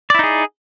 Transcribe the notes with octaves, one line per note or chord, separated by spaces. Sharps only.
D#4 E4 G#4 D5